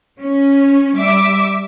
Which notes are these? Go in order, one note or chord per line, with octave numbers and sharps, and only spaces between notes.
C#4
G3 E5 D6